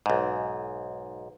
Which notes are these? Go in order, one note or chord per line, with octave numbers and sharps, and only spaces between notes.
B1 G#2